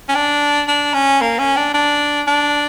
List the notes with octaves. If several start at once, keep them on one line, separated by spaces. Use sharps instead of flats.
C#4
D4
D4
C#4
A#3
C#4
D4
D4
D4